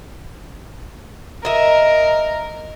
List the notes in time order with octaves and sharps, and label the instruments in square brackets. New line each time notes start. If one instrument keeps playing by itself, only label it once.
[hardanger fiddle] A#4 [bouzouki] D#5 E5